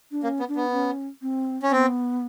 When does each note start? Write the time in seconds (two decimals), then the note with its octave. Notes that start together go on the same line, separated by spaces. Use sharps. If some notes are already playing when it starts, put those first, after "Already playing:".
0.12 D4
0.23 A#3 C#4
0.40 B3
0.48 D4
0.56 B3
0.72 C#4
1.22 C4
1.63 C#4
1.71 B3 C4